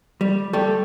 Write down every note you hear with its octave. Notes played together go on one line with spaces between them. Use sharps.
G3
G3 A3 A4